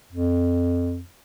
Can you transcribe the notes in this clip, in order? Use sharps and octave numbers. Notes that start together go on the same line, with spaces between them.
F2